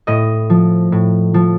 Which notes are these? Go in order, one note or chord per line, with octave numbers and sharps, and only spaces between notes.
A2 D#5
F3
A2
F3